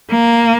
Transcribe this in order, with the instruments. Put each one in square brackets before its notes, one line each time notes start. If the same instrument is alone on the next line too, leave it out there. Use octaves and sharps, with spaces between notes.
[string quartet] A#3